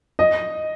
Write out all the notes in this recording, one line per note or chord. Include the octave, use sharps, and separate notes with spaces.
D#5